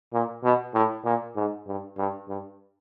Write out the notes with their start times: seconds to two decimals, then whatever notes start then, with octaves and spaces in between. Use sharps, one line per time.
0.13 A#2
0.43 B2
0.74 A2
1.05 A#2
1.36 G#2
1.67 G2
1.97 G2
2.29 G2